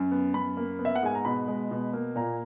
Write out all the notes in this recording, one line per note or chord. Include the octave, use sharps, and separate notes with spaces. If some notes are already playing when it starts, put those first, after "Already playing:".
Already playing: F#2
B3
F#2 B5
A#3
B3
E5
F#5
G#2 G#5
A#5
B2 B5
G#3
B2
A#3
A#2 A#5